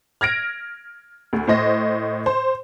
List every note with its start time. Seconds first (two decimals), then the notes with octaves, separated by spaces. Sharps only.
0.21 F6 G#6 A#6 D7
1.33 D2
1.47 A2 C5 D#5 A#6
2.26 C5